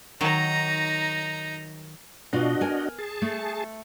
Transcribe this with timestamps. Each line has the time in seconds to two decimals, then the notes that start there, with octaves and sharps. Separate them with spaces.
0.21 D#3 F#3 D#4 A#5
2.33 B2 D4 F4 F#4 D#5
2.61 A#4 G#5
2.98 G#4 A5
3.22 A3